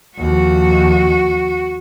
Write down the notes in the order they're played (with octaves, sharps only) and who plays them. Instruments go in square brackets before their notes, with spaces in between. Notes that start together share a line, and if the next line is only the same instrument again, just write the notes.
[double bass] D#2 F3 [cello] F#4